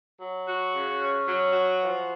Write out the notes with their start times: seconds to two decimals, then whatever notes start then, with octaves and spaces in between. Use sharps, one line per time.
0.19 F#3
0.46 F#4
0.73 C#3
1.00 C#4
1.27 F#3
1.53 F#4
1.81 F3